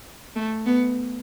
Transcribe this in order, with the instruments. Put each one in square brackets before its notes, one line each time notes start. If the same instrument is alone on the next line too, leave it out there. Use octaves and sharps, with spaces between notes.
[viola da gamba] A3
B3